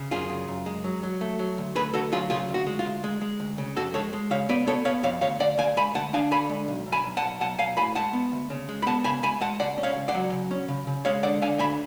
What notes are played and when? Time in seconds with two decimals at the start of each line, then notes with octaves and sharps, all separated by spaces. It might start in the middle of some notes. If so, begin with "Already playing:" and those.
Already playing: C#3
0.11 F#2 F4 G#4
0.29 C#3
0.48 F#2
0.66 G#3
0.84 F#3
1.03 F#3
1.21 A3
1.39 F#3
1.58 D2
1.75 A3 G#4 B4
1.94 D2 F#4 A4
2.12 F#3 F4 G#4
2.30 C#3 F4 G#4
2.49 D2
2.54 F#4
2.66 G#3
2.79 F4
2.86 D2
3.04 G#3
3.21 G#3
3.40 D2
3.58 C#3
3.76 F2 F#4 A4
3.94 G#3 A4 C#5
4.13 G#3
4.30 C#3 C#5 F5
4.49 B3 B4 D5
4.67 B3 A4 C#5
4.85 B3 C#5 F5
5.03 F2 C#5 F5
5.21 D2 C#5 F5
5.40 D2 D5 F#5
5.58 D2 F5 G#5
5.76 G#3 G#5 B5
5.94 D2 F#5 A5
6.13 D4 F5 G#5
6.31 D3 G#5 B5
6.50 G#3
6.68 B1
6.86 B1
6.92 G#5 B5
7.04 B1
7.17 F#5 A5
7.22 B1
7.40 B1 F#5 A5
7.59 B1 F5 G#5
7.77 A2 G#5 B5
7.95 G#3 F#5 A5
8.13 B3
8.32 D2
8.50 C#3
8.69 G#3
8.82 B5
8.86 B3 F#5 A5
9.04 C#3 G#5 B5
9.23 G#3 G#5 B5
9.41 G#3 F#5 A5
9.60 C#2 D5 F#5
9.78 C#4
9.83 C#5 F5
9.97 C#2
10.08 D5 F#5
10.14 F#3
10.32 C#3
10.51 C#4
10.68 C#3
10.87 C#3
11.05 G#3 C#5 F5
11.23 D3 D5 F#5
11.42 D3 F5 G#5
11.59 D2 G#5 B5